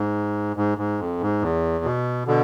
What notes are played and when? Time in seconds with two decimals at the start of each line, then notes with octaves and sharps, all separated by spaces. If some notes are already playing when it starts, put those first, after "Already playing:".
Already playing: G#2
0.57 G#2
0.78 G#2
0.99 F2
1.21 G#2
1.42 E2
1.85 B2
2.27 B2 D3